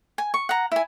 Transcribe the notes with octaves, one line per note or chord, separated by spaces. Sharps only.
G#5
C#6
F#5 A#5
E4 G#5